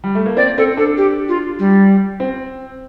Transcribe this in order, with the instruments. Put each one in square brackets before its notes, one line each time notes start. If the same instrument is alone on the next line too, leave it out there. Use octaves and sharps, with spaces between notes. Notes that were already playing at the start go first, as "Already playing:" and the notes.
[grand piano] G3
A3
A#3
[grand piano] C4 [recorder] D5
[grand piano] C4 [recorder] A4
[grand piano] D4 [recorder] A4
[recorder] G4
F4
G3
[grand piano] C4